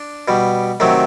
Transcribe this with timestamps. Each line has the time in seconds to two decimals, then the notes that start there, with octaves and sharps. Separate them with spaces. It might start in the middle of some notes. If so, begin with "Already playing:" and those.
Already playing: D4
0.28 B2 G3
0.80 C3 D#3 F#3 A3